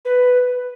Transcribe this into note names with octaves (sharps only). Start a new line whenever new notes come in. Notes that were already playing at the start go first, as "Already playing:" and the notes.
B4